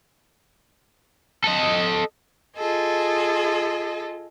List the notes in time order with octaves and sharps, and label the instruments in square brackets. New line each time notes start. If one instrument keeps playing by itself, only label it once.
[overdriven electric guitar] A4 D#5
[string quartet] F4 G#4 A4 D#5